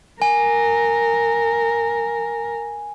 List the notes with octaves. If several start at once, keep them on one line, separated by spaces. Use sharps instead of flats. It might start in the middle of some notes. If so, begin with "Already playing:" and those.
A#4 G#5